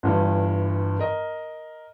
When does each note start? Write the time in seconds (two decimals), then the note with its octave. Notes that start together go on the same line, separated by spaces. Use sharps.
0.03 G1 G2 E3
0.99 A#4 D#5